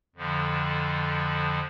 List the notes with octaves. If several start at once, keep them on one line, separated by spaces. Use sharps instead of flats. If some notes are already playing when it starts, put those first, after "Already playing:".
F2 D3 F3